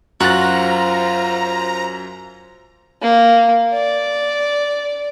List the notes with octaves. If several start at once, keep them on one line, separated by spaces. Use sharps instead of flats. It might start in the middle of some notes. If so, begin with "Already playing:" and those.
F#2 F4 F#4 C5 F#5 A#5 A6
A#3
D5